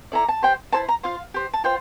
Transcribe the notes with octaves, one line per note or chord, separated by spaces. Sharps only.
E4 A4 D5 A#5
A5
G4 C5 G5
E4 A4 C5 A5
A#5
F4 C5 F5
G4 C5
A5
F4 C5 G5